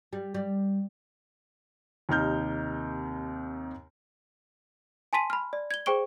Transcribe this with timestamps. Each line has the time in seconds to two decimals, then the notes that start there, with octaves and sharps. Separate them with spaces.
0.13 G3
0.34 G3
2.09 D#2 C3 D#4 F6 G6
5.13 G#5 A5 C6 B6 D#7
5.30 B5 F6
5.53 D5
5.71 G#6 G7
5.86 G#4 C5 G5 C#6 D7 G7